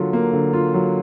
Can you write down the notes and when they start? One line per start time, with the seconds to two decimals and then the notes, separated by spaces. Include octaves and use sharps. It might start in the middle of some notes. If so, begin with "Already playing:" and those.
Already playing: D3 F#3 A#3 F4
0.13 A#3
0.33 D3
0.53 F4
0.74 F#3